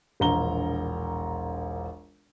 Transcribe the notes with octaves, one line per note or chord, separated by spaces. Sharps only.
E1 A#1 A#5 G7